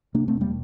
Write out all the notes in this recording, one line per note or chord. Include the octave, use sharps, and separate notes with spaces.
C3 A#3 D4
A3 C4
E1
G3 A#3